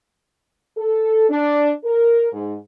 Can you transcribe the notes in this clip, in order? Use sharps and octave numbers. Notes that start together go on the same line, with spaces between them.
A4
D4
A#4
G#2